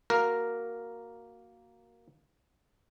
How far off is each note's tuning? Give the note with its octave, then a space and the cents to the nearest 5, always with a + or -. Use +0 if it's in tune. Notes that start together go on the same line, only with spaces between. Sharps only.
A#3 +0 F#4 +0 A#4 +0